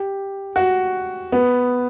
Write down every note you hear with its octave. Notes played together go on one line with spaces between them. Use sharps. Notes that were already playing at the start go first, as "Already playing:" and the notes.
Already playing: G4
F#4
B3